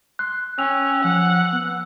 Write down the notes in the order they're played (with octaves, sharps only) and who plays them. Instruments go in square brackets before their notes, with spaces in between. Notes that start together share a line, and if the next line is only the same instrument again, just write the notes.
[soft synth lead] C6 [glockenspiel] F#6
[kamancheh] C#4 [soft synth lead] G5 [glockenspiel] E6 F7
[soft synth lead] F3 [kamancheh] F#5
[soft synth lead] B3